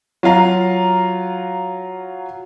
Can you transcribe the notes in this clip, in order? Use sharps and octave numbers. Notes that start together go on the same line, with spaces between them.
F#3 F4 F5 A#5